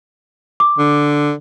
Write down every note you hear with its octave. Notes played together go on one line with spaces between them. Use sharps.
D6
D3